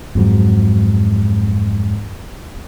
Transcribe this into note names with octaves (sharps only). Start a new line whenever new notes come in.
F2 G#2 F#3